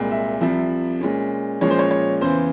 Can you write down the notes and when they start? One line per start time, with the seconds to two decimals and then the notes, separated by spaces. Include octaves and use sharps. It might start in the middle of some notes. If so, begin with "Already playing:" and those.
Already playing: C2 A#2 G#3
0.11 E5
0.41 C2 C3 F3 E5
1.01 A#2 G#3 C#4
1.61 A#2 F3 G#3 C#4 C#5
1.70 C5
1.79 C#5
1.91 C#5
2.21 E2 C#3 E3 C5